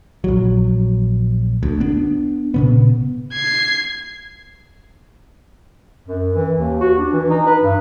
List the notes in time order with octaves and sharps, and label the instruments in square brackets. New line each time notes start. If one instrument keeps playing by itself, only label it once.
[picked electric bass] A#1 F#3
D2
B3 D4
A#2 C#3 B3
[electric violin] G#6 C7
[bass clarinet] F#2
E3
D#2
F#4
D4
E3
D#4
B4
G2